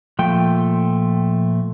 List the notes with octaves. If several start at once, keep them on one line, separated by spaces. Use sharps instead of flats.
A#2 F3 A3 G5